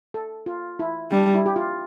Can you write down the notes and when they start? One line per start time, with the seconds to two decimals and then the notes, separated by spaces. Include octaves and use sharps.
0.14 A4
0.46 F4
0.79 E4
1.11 G3 D4
1.34 E4
1.46 G4
1.56 F4